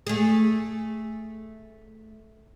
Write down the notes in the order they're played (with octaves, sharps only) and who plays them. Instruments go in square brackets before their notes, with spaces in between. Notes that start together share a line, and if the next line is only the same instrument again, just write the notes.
[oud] A3 G#4